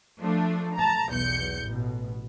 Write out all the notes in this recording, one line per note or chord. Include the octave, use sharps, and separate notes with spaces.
F3 A3 D4
A5 A#5
B1 E2 G6 C#7
A1 B2